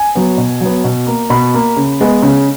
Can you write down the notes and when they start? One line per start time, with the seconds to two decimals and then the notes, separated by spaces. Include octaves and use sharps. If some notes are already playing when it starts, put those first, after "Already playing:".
Already playing: G#5
0.15 F#3 B3
0.38 B2
0.61 F#3 B3
0.84 B2
1.07 A#3
1.30 B2 B5
1.54 A#3
1.77 C#3
2.01 G#3 B3
2.22 C#3